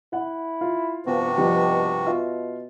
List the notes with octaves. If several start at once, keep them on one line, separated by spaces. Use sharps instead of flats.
E4 F#5
F4
G2 C3 F3 B3 F#4
B2 F3 G3
B2 F4 E5